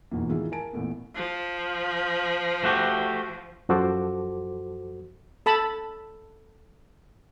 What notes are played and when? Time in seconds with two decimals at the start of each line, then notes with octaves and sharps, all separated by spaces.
0.11 E2 G#2 B2 F3 A#3
0.29 A2 D#3 E3 G#3 E4 F4
0.52 A#4 G#5 A5 D7
0.73 A1 A#2 A3 B3
1.15 F3
2.64 A3 F#4 G4
3.69 F#2 F3 F#4 A4 C5 D6
5.46 A4 A5 B5